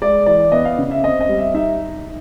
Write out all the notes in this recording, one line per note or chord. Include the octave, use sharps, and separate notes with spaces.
G#3 D5
E3 D5
B3 D#5
F5
C#3
E5
C4 D#5
D#5
G3
E5
D#4 E5